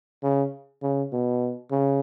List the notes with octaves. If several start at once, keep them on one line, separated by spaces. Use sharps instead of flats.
C#3
C#3
B2
C#3